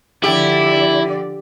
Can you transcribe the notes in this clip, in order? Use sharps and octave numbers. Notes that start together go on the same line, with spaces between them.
D3 F3 E4 G4 D5